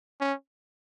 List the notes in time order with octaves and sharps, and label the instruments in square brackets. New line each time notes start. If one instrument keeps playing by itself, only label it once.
[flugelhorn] C#4